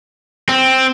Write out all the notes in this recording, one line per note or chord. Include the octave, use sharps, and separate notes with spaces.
C4